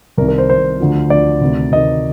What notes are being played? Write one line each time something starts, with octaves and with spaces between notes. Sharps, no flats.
C2 C3 D#3 A#4
A#4
C5
C2 C3 D#3 C5
D2 D3 F3
D2 D3 F3 D5
D2 C3 D#3
D2 C3 D#3 D#5